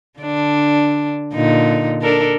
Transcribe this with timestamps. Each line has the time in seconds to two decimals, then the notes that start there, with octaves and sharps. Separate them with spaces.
0.20 D3 D4
1.34 A#2 D3 D#4
2.01 D4 A4 A#4